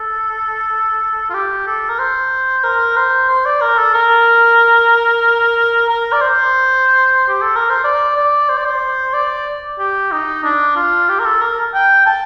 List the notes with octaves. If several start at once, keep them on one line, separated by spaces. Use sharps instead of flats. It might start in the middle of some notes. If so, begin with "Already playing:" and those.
Already playing: A4
F4
G4
A4
A#4
C5
A#4
C5
C5
D5
A#4
A4
A#4
A#4
D5
C5
G4
A4
A#4
C5
D5
D5
C5
D5
C5
D5
G4
D#4
D4
F4
G4
A#4
A4
A#4
G5
A5